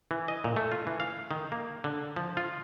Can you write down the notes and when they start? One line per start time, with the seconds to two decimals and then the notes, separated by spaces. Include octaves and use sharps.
0.11 E3
0.28 D#5
0.44 A#2
0.56 A3
0.72 F4
0.87 E3
1.00 F5
1.31 D#3
1.52 A#3
1.84 D3
2.16 F3
2.37 F4